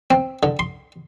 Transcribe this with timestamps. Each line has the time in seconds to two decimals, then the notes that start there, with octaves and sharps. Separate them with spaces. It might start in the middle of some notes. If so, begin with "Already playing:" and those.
0.11 C4
0.43 D3
0.59 C6